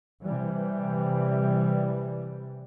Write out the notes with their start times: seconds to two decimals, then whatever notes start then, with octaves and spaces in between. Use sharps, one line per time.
0.21 C3 E3 G3